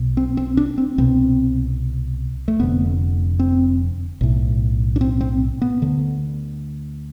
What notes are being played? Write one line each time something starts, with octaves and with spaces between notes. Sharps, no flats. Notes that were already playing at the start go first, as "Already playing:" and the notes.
Already playing: B1 B2
C4
C4
D4
C4
C2 B2 C4
A3
F1 F2 D3 B3
C4
B1 A2
D4
C4
C4
B3
D2 D3